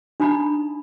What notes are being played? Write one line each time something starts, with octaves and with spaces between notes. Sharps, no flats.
D4 D#4 A#5 B5